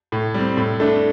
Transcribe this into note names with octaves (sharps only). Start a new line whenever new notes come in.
A2
G3 C4
A2
A3 D4